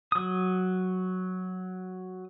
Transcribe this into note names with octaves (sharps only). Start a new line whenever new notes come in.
F#3 D#6